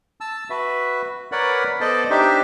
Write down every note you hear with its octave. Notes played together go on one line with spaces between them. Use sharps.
A5 E6
F#4 B4 E5
A#4 B4 C#5 D5 F#5 B5
B3 A4 C5 D5 D#5 A5
D4 D#4 G4 C5 E5